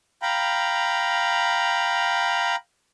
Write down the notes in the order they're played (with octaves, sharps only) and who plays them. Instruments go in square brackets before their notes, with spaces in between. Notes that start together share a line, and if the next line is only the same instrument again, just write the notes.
[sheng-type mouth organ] F5 G5 A#5 B5